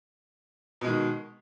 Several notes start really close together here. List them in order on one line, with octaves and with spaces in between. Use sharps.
B2 G#3 D#3